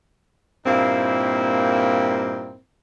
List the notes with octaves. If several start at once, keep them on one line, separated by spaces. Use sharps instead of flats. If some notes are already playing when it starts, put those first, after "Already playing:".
G2 A#2 A#3 C4 D#4 E4